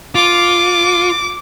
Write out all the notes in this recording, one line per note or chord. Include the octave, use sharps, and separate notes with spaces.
F4 D6